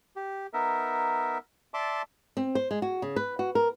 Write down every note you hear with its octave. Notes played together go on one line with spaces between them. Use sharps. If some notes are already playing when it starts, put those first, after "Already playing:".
G4
B3 D#4 A#4 E5
D5 E5 A5 C6 D6
C4
C5
G#3
F#4
C#3
B4
F#4
A#4